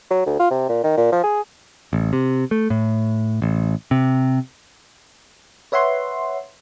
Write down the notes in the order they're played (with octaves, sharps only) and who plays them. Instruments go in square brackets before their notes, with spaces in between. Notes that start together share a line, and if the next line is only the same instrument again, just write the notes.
[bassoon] F#3
D2
F4
C3
A#2
D#3
A#2
F3
G#4
[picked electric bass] A1
C3
A3
A2
A1
C3
[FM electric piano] B4 C#5 E5 F#5 C6